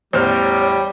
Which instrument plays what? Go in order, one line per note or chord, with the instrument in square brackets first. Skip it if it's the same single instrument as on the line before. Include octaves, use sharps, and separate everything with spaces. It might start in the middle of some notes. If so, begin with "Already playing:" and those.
[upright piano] A1 E2 F6 [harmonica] G3 [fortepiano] C5 [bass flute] C#5